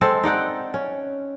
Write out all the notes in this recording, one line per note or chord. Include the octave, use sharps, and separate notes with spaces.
G#3 C4 A4
D#4 D5 F#5 G5
C#4